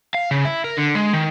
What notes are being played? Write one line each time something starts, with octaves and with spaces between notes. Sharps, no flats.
F5
C#3
E4
A#4
D3
G#3
D#3